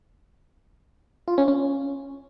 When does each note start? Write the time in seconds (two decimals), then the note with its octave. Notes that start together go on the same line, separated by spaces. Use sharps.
1.28 F4
1.38 C#4
1.48 C#4